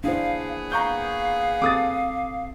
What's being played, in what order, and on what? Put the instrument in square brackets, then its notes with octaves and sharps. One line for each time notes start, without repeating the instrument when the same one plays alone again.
[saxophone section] A#2 B3 G#4 [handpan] D4 E4 C5 [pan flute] F5
[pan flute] F5 [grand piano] A#5 C#6 G6
[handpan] C4 A4 [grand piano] D6 D#6 A6